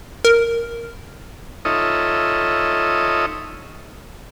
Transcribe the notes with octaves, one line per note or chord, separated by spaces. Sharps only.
A#4
D#4 F4 A4 C#5 D#5 E5